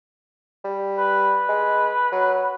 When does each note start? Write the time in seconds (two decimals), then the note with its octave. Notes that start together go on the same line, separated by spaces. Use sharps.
0.65 G3
0.98 B4
1.49 G#3
2.12 F#3